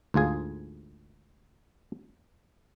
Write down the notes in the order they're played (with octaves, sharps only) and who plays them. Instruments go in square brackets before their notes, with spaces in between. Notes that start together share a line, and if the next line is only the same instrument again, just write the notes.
[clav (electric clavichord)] D2 G#2 F4 G#4